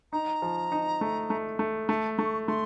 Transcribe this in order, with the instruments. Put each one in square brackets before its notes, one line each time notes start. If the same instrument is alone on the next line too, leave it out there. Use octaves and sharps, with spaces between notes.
[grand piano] D#4 [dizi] A#5
[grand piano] F3
D#4
A3
A3
A3
[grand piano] A3 [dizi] A5
[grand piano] A3 [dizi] C#6
[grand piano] A3 [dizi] C6